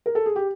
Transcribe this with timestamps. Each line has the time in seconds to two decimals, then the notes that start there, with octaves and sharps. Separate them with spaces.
0.06 A#4
0.15 A4
0.26 G#4
0.36 G4